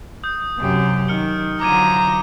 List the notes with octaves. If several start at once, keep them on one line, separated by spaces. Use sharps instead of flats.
D#6 G6
F#2 C3 G4
D#3 F6 C#7 G7
D3 F3 F#3 A#5 D6 G#6 D#7